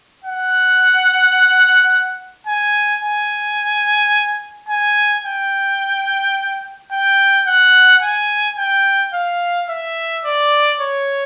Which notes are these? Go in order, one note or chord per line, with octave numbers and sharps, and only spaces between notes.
F#5
G#5
G#5
G#5
G5
G5
F#5
G#5
G5
F5
E5
D5
C#5